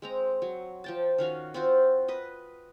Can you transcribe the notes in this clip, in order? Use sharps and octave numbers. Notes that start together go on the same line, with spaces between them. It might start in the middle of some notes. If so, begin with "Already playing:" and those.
G#3 C4 A#5
F#3
F3 G5 A5
D#3 C#4 F#4 F5
C4 F4 F#4 C5
B4 D#5